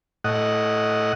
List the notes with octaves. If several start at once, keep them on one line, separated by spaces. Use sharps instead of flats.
A2 D#5 F#5